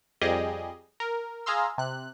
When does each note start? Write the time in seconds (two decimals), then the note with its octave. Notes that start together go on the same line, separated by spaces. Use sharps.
0.21 F2 G3 G4 G#4 D#5
1.00 A#4
1.46 G#4 F5 A#5 C6 E6
1.78 C3 F#6